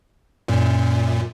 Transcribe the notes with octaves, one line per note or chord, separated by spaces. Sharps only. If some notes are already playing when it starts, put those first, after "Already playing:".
F#2 A#2